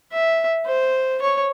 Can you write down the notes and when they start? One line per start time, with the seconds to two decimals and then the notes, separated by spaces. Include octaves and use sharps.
0.12 E5
0.66 C5
1.22 C#5